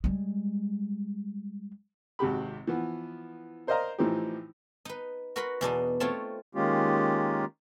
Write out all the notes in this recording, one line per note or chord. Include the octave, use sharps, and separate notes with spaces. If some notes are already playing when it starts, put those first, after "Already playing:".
G3 G#3
G#1 C3 F#4 G4 B5
E3 F3 B3
A#4 C5 D5 D#5 F5 A#5
A2 E3 F3 C4 D#4 G4
D#4 B4
F#4 A#4 B4 F#5 B5 C6
E2 B2 D4 D#4
A3 C4 F4 C#5
D#3 G#3 A#3 C#4 F4 G4